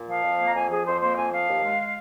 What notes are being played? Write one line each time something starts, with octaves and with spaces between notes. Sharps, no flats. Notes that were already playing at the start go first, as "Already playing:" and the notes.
Already playing: A#2
F3 F5
F2
A#3
A#5
F2 G#5
F3 G#4
F2 C5
A#3 C5
F2 G#5
F3 F5
D#2
G#3